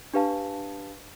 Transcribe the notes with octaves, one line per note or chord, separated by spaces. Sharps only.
D4 G4 B4 F5 A5